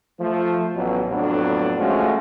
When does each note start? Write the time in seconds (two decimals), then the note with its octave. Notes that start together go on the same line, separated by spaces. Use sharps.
0.20 F3 A3
0.75 A1 B2 F#3
1.09 F2 A2 D3 F#3 B3 D4
1.79 F3 G#3 A3 C#4 F4 F#4